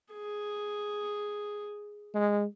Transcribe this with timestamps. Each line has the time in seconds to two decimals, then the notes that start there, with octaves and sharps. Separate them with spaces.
0.13 G#4
2.15 G#3